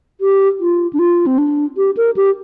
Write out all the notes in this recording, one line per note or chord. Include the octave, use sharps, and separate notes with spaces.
G4
F4
D4
F4
C4
D4
G4
A#4
G4